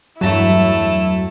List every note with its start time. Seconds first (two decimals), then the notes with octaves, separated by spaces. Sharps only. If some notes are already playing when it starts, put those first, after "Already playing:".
0.21 E2 G2 F#3 A3 E4 A5